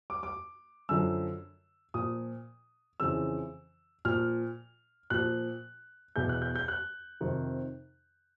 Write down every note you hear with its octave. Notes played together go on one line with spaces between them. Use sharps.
D6
D6
F#2 D3 F3 E6
A#2 F3 D#6
F2 C#3 E3 E6
A#2 F3 F6
A#2 F3 F#6
E2 B2 G6
F#6
G6
G6
F#6
F2 C3 D#3